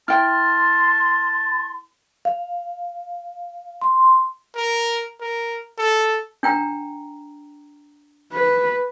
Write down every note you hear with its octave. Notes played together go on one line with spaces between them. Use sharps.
E4 G5 A5 C6 F6
F5
C6
A#4
A#4
A4
D4 G5 A#5
B4